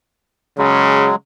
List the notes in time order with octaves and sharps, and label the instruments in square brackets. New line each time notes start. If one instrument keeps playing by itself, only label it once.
[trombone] C#3 [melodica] F#3 G#3